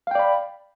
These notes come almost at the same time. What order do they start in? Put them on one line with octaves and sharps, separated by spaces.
F5 G5 D5 B5